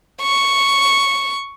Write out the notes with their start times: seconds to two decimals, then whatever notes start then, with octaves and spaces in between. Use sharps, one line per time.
0.22 C#6